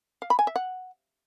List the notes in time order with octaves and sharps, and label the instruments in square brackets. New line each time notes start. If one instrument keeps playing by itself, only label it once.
[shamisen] F5
B5
G#5
E5
F#5